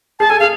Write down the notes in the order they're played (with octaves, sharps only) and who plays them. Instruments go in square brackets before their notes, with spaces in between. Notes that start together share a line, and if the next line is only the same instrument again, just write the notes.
[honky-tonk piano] G#4 [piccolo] A5
[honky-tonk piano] A4 [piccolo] G#5
[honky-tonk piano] G#4 [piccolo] F5